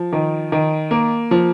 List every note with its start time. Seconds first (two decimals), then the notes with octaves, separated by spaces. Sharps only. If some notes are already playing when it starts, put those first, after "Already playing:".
Already playing: F3
0.13 D#3
0.52 D#3
0.91 A#3
1.31 F3